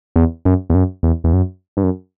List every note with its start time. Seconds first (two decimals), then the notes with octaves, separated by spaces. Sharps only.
0.16 E2
0.45 F#2
0.70 E2
0.75 F#2
1.03 E2
1.24 E2
1.33 F#2
1.77 G2
1.83 F#2